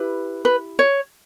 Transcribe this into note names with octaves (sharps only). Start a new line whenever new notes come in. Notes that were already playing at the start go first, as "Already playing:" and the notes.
Already playing: E4 G4 B4
B4
C#5